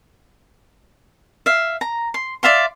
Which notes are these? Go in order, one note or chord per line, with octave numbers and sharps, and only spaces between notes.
E5 F5
A#5
C6
D5 E5 F5 C6